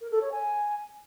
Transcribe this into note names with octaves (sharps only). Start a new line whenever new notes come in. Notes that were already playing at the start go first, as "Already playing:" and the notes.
A#4
A4
C#5
G#5